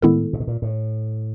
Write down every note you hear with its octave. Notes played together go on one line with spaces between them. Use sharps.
A2 D#3 G#3 B3 E4 A4
A#2
B2
A#2
A2